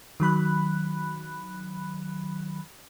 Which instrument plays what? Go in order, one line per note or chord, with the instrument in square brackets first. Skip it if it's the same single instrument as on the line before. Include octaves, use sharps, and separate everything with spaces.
[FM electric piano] D#3 F#3 B5 F#6